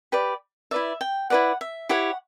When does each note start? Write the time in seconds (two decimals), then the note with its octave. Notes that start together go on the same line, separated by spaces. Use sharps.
0.12 G4 B4 D5
0.71 E4 B4 D5 E5
1.01 G5
1.30 E4 B4 D5 F#5
1.61 E5
1.89 E4 G4 C#5 F#5